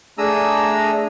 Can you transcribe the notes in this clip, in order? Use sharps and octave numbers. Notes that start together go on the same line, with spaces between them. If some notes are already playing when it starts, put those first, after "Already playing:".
A3 D4 G#4 A#5 D#6 E6